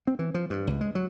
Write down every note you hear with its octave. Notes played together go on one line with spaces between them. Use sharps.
C4
E3
F3
G2
C#2
G#3
F#3